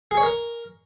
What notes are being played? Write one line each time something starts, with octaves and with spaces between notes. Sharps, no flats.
G#4
C#5
A#4